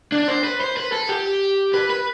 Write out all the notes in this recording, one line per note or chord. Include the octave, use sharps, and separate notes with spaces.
D4
C5
B4
C5
B4
A4
G4
B4
B4